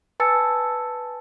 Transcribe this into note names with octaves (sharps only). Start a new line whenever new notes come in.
B4 G#5 A5 E6 A6 C#7